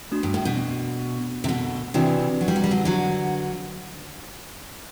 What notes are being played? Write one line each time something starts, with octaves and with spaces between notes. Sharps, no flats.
A3 D4 F#4
G2
A2
B2
C3
B2 D3
C3 E3 D4 F#4 B4 D5
F#3
G3
F#3
G3
D3 F#3
D3 F#3